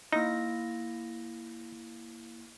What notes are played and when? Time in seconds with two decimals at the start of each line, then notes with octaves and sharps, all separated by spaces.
0.12 A#3 D#4 E4 A#6